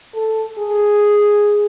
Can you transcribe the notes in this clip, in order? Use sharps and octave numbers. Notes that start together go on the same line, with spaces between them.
A4
G#4